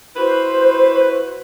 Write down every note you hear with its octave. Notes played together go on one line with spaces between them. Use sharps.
E4 F#4 B4 C5